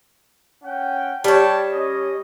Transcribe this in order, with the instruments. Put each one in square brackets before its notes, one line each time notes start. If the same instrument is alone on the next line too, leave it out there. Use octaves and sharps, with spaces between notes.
[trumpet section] C#4 F#5 G5
[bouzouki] G3 C#5 [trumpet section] G5 A5
[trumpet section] C#4 D#5